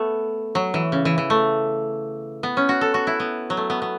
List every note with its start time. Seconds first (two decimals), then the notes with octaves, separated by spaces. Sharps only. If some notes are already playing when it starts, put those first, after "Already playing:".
Already playing: A3 B3
0.55 F#3
0.74 E3
0.92 C#3
1.05 E3
1.18 E3
1.30 A3
2.43 B3
2.57 C#4
2.69 F#4
2.81 A4
2.94 F#4
3.07 E4
3.20 B3
3.50 F#3
3.57 A3
3.70 B3
3.82 B3